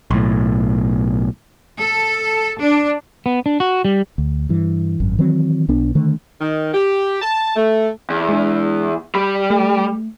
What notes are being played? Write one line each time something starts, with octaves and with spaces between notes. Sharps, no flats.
B1 A2
A4
D4
B3
D4
F#4
G3
D2
G2 E3
G#1 F#2
D#3 E3 F#3 C4
B1 B3 D4
D3 D#3 A3
D#3
G4
A5
A3
E2
G#3 D4
G3 B5
A3